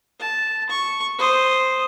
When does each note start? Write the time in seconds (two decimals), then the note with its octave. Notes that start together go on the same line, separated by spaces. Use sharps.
0.20 A5
0.70 C#6
1.19 C5 D#6